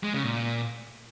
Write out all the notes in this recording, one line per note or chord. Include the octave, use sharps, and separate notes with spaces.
G#3
C#3
A#2